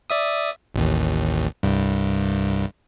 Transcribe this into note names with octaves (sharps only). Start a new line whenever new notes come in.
D5 E5 D#6
A1 D#2
C2 G2